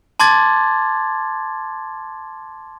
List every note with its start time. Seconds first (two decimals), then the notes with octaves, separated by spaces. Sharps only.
0.20 A5 C6 D6 G#6 A6